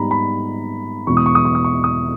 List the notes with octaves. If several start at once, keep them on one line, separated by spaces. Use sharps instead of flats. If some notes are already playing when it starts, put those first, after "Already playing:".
Already playing: G#2 G3 B3 D#4 A#5 B5
B5
E2 B2 G#3 B3 E4 C#6
D#6
C#6
D#6
C#6
D#6
C#6
D#6